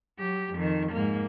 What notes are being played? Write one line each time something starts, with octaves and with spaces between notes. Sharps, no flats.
F#3 G4
F2 D#3
G#2 A#3